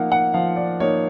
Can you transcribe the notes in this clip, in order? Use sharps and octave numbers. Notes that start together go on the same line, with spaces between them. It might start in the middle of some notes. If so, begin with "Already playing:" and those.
Already playing: F3 A#3 D#4 F5 F#5
F#5
F3 F5
D5
A#3 D#4 C#5